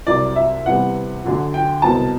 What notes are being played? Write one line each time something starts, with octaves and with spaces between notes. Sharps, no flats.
C2 C3 F#3 D5
E5
E2 C3 G3 B3 F#5
D2 D3 F#3
G5
C2 B2 F#3 C4 A5